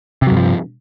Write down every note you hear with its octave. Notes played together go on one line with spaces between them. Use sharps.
G2 C3 F3 F#3